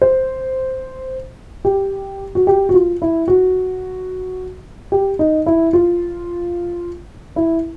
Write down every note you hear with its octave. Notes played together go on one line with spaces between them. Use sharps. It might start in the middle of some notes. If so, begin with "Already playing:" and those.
C5
G4
F#4
G4
F#4
F4
E4
F#4
G4
D#4
E4
F4
E4